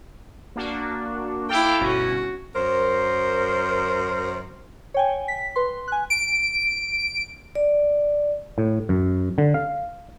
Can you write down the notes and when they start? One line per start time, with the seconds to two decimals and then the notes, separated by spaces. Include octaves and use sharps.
0.56 A#3 D4 F#4
1.49 E4 A4 F5 G5 D6
1.81 G1 B2 C#4 F#4
2.56 F#2 A#4 C5
4.94 C#5 G5 G#5
5.28 B6
5.56 B4 C6
5.88 G#5 F#6
6.10 D7
7.55 D5
8.58 A2
8.89 F#2
9.38 D3
9.54 F5